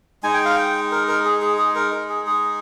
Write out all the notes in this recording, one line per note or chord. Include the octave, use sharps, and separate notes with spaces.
G#3 D#4 G#5
G5
F5
G5
A#4
A#4
G#4
G#4
G#4
A#4
A#4
G#4
G#4